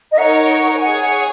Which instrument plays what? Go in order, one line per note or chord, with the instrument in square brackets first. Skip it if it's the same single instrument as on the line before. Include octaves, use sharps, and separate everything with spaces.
[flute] D#5
[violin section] D#4 A#4 C#5 [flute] F#5
[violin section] G#4 C#5 G#5 [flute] F#5
[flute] F#5